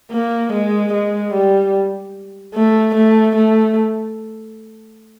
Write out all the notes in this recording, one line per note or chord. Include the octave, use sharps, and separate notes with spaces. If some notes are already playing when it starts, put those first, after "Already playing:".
A#3
G#3
G#3
G3
A3
A3
A3